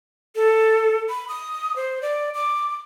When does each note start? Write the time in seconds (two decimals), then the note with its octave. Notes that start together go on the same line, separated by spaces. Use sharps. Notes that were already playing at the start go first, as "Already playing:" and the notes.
0.35 A4
1.09 B5
1.29 D#6
1.76 C5
2.02 D5
2.34 D6